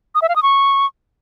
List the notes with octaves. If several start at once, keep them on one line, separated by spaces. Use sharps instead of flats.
D#6
E5
F5
D#6
C#6